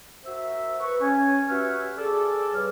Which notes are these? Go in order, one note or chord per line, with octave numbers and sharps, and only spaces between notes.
F#4 A#4 C5 E5
B4 C#6
C#4 G#5
F#4 G4 B4 C#5 E5 F6
G#4 A4 D5
G2 G3 C#5 F6